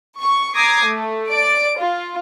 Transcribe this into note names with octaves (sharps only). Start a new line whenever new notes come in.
C#6
A#5 D6 D#6 G#6 A#6 C7
A3
D5 D7
F4